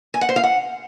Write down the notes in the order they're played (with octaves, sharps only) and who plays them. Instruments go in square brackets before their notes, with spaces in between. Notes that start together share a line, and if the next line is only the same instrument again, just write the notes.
[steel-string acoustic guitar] G#5
F#5
C5
F5
F#5